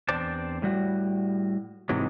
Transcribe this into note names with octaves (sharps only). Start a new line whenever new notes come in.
E2 C4 D4 C5 D5 A5
A2 G3 F#4
G#2 C3 E3 F#3 G#3